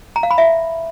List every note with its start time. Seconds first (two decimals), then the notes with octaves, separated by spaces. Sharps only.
0.16 A#5
0.23 F5
0.31 B5
0.38 E5